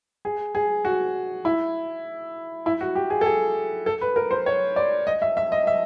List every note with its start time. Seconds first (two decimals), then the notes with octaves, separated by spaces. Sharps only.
0.25 G#4
0.55 G#4
0.85 F#4
1.45 E4
2.66 E4
2.81 F#4
2.95 G4
3.10 G#4
3.21 A4
3.26 G#4
3.86 A4
4.01 B4
4.16 A#4
4.31 C5
4.46 C#5
4.76 D5
5.07 D#5
5.22 E5
5.37 E5
5.52 D#5
5.67 E5